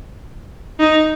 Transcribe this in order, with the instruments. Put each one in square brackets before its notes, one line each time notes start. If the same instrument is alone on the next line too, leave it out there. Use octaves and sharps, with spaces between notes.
[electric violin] D#4